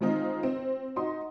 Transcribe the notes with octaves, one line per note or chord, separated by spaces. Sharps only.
D#3 F3 G#3 C4 D#4 F4
C4
D#4 F#4 D#5 C6